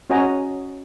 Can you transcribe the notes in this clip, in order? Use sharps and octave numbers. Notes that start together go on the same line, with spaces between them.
C#4 F#4 C#5 D#5 G#5 A#5